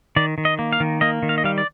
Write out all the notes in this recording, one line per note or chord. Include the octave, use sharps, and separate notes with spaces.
D#3 D5
D#3
D#5
A#3
F5
D#3
A#3 D#5
D#3
F5
D#5
G3 F5
D5